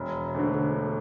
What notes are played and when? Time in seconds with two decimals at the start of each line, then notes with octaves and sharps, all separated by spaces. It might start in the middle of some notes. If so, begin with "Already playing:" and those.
Already playing: E1
0.34 D2 D3